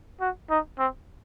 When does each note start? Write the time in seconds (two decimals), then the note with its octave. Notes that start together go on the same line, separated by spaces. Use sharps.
0.21 F#4
0.50 D#4
0.79 C4